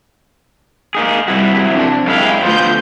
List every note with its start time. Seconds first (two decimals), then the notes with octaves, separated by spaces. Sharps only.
0.95 A#3 D#4 G#4
1.28 C3 G3 E4 F#4
1.71 F3 C4 D4
2.07 F#2 G#3 E4 F5 G5
2.43 D2 F3 B3 F4 C5 G6